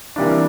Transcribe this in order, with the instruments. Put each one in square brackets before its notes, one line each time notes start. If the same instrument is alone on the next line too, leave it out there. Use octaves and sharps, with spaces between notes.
[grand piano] C3 E3 G3 A#3 D4